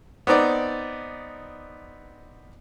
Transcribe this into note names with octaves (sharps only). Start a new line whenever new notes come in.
B3 C4 D#4 D5